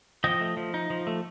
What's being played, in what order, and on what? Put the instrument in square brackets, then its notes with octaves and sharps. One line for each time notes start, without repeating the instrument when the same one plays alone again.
[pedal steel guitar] F3 D#5 G5
A3
F3
D#4
F3
A3